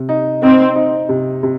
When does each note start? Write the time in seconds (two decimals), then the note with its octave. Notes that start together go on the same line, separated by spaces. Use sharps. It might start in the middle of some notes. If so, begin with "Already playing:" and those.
Already playing: C3
0.09 D#4
0.43 C4 D#4
0.76 D#4
1.09 C3
1.43 C3